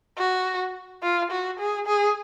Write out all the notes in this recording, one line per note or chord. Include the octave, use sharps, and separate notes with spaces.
F#4
F4
F#4
G#4
G#4